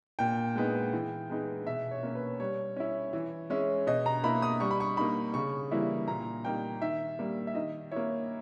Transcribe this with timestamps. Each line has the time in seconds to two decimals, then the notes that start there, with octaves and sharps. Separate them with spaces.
0.19 A#2 G5
0.56 G#3 B3 D#4
0.93 E3
1.30 G#3 B3 D#4
1.66 B2 E5
1.91 C#5
2.03 A#3 C#4
2.15 B4
2.40 G3 C#5
2.76 C#4 E4
3.13 E3
3.50 G#3 C#4 E4
3.87 B2 D#5
4.06 A#5
4.24 A#3 E4 B5
4.42 D#6
4.60 G3 C#6
4.71 B5
4.80 C#6
4.97 A#3 D#4 B5
5.34 C#3 C#6
5.71 E3 G3 A#3 E4
6.08 A#2 A#5
6.44 G3 A#3 D#4 G5
6.82 D#3 E5
7.19 G3 A#3
7.47 E5
7.55 D#3 D#5
7.92 A#3 E4 C#5